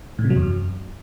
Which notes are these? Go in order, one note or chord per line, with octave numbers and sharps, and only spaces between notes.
A2
C3
F#3
E2
F#2